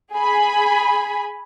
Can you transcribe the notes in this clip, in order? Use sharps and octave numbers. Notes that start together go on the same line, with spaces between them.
G#4 G#5 B5